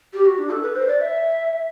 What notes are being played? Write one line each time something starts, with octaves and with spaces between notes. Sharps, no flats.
G4
F#4
D4
A4
B4
C5
D5
E5